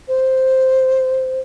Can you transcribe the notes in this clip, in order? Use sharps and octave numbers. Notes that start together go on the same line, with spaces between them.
C5